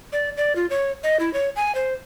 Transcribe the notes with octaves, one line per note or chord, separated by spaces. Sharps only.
D5
D5
F4
C#5
D#5
E4
C#5
G#5
C5